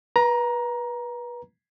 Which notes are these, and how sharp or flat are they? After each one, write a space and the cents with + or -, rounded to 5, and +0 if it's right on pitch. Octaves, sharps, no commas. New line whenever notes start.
B4 -25 A#5 +15